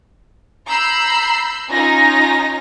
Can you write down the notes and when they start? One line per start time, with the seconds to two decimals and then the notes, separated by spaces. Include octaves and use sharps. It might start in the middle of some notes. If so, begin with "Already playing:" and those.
0.68 A#5 B5 E6 G6 C7
1.71 C#4 D#4 F4 G#5 A#6